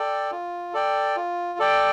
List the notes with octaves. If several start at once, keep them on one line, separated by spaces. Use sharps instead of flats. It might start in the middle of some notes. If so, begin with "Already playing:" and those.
Already playing: A4 D5 G5
F4
A4 D5 G5
F4
A4 D5 G5